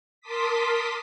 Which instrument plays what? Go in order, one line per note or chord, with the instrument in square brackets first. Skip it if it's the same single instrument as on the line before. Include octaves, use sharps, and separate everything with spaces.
[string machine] A#4 A5 C6 D6 D#6 B6